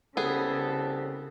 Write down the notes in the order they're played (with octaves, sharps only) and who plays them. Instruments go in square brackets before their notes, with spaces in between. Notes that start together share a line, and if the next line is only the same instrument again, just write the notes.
[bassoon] C2 [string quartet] C#3 [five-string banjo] B3 G#4 [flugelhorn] A4